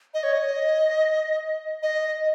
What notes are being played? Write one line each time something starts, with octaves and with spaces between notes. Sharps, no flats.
D#5
C#5
D#5
D#5